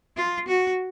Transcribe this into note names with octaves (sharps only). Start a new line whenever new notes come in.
F4
F#4